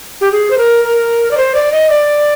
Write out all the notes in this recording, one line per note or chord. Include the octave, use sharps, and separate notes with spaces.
G4
G#4
C5
A#4
A#4
D5
C5
D5
D#5
D5